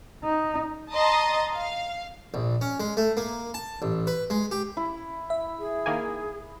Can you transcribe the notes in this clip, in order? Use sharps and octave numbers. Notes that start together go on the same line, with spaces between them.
D#4
D#5 A5 A#5 C6 D#6
F5
A#1
C#4
G#3
A3
A#3
A5
A1
B4
G#3
G4
E4
E5
G#4
D#3 A#3 G#5